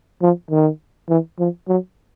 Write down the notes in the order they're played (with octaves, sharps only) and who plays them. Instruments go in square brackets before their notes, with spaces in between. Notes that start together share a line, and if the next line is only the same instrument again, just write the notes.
[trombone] F3
D#3
E3
F3
F#3